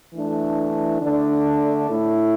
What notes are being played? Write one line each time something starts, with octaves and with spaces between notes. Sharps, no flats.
E3 A3 D4
D3 A3 D4
A2 A3 E4